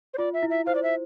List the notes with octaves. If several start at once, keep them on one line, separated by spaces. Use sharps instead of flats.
C5
F4 D5
E5
E4
E5
C5 F5
D5
E5